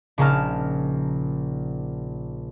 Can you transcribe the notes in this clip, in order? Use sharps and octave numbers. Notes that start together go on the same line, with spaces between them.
A#1 C#3 C#4 D#4 A5 F6